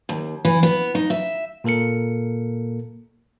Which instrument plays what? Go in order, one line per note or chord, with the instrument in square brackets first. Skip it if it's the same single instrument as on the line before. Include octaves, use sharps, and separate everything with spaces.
[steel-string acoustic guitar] D#2
E3
B3
D#4
E5
[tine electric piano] A#2 A#3 A4 A#4 C#7